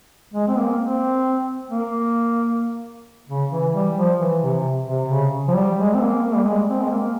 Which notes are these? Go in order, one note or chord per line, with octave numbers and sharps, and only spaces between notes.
G#3
C4
A#3
C4
A#3
C#3
E3
G3
F3
E3
C3
C3
C#3
F3
G3
G#3
C4
A#3
A#3
G3
G#3
C4
G#3
A#3